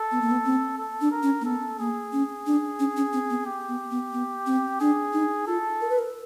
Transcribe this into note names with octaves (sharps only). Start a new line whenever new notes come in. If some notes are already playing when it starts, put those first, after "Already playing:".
Already playing: A4
B3
A#3
B3
C4
A4
D4
A#4
C#4
A#3
B3 A4
A#3 G#4
C#4
D4
C#4
C#4
C4
B3
G4
B3
B3
B3
C4
D4 G#4
D#4
F4 A4
A#4
B4
A#4